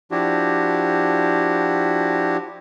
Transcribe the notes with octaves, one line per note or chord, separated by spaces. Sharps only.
F3 D4 E4 F#4 G4